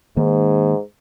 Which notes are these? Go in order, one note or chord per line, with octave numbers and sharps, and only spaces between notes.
G#2 D#3 A#3